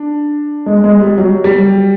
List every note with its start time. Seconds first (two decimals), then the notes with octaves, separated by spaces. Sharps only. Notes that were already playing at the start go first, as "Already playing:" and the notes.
Already playing: D4
0.66 G#3
0.84 G#3
1.01 G3
1.18 F#3
1.44 G3